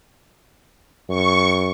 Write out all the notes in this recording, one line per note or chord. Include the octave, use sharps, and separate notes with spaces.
F#2 C#6